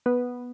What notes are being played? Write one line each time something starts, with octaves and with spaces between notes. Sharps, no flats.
B3